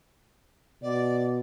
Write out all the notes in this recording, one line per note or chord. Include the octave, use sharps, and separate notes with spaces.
B2 D5